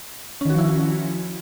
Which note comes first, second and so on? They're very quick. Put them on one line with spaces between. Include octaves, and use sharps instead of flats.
C#4 D#3 F#4 F3 E4